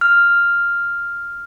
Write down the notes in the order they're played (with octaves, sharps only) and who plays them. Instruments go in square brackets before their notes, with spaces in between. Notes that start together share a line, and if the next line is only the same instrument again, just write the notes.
[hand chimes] F6